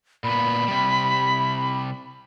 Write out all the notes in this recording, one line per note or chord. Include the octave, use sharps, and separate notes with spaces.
A#2 B3 B5
C3 G3